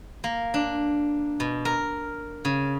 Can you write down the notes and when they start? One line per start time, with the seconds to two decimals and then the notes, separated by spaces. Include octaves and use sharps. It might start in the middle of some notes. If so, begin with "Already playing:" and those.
0.24 A#3
0.54 D4
1.40 B2
1.65 A#4
2.45 C#3